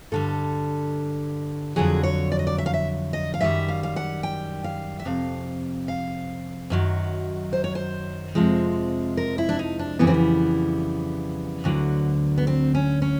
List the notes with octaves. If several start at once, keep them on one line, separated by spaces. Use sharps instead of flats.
G2 D3 G3 A4
F2 D3 F#3 G#4
C#5
D5
D#5
D5
E5
F5
E5
D#5
F5
F#2 D#3 G3 E5
F5
F5
F#5
G5
F5
E5
F2 C3 F5
F5
F#2 D#3 F#3
C5
C#5
C5
F2 C3 F3 G#3
A#4
E4
D4
D#4
D4
F2 C#3 E3 G3 B3
C4
B3
D2 D3 F#3
B3
C4
C#4
C#4